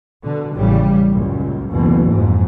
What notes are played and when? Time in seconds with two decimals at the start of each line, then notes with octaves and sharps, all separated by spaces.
0.23 B2 D3
0.55 A1 C#3 G3
1.11 C#2 F#2 A#2
1.70 F#1 D2 B2 E3
2.10 F2 G#2